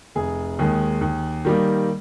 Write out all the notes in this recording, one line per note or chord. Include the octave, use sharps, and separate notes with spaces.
F1 G#4
D#2 D#3 G#3
D#2
D#3 G3 A#3